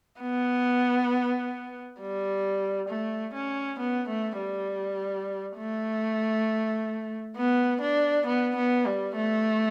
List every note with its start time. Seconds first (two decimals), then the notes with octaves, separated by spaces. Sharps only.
0.21 B3
2.00 G3
2.89 A3
3.34 C#4
3.79 B3
4.08 A3
4.38 G3
5.57 A3
7.37 B3
7.81 D4
8.26 B3
8.56 B3
8.86 G3
9.16 A3